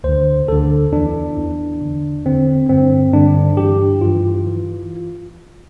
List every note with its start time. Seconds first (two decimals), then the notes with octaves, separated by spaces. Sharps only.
0.04 D2 D3 C5
0.48 D2 D3 A4
0.92 E2 E3 D4
1.36 E2 E3
1.81 E2 D3
2.25 E2 D3 C4
2.69 G2 D3 C4
3.13 G2 D3 D4
3.57 G2 E3 G4
4.01 G2 E3 F4
4.47 E3